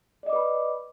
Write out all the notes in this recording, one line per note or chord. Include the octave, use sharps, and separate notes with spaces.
B4 D5 D#5 B5 D6